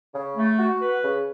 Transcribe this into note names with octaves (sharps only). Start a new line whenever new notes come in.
C#3
A3
F#4
B4
C#3